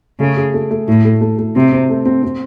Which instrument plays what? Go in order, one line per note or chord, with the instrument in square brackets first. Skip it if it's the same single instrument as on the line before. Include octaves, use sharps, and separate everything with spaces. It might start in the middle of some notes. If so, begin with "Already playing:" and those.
[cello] C#3 [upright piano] A3
[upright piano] G#4
A3
A3
[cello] A2 [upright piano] E4
[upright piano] A3
A3
A3
[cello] C3 [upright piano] C4
[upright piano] C4
A3
C4
C4